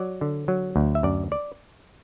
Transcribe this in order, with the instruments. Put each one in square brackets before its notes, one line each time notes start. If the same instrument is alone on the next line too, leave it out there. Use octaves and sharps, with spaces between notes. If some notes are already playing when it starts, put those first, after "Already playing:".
Already playing: [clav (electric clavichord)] F#3 D5
D3
F#3
D2
E5
F#2 D5
D5